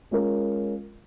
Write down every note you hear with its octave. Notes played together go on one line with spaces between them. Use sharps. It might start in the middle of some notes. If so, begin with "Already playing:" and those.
G#3 C#4 F4 A#4